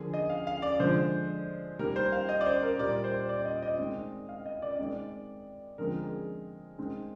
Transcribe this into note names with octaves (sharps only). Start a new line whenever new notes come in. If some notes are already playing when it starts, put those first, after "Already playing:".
Already playing: D3 F3 A#3 G#4
D#5
F5
F5
D5
D3 F3 G#3 C5
D#3 G3 A#3 A#4
C5
F5
D#5
D5
C5
A#4
A#2 G3 A#3 D5
C5
D5
D#5
D#5
D#3 G#3 C4
F5
D#5
D5
D#5
D#3 G#3 C4 D5
D3 F3 G#3 C4 A#4
G#4
D#3 G#3 C4